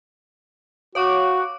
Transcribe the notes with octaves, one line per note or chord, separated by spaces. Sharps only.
F#4 C#5 F5 D6